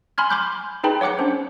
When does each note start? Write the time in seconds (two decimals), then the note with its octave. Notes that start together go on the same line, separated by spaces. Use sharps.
0.18 G#5 B5 C6 F6 G#6
0.30 B5 C6 D6 F#6 G6
0.84 D#4 G#4 B4 G5 A5 B5
1.01 C#5 F#5 D6 F#6 C#7
1.19 C#4 D4 C5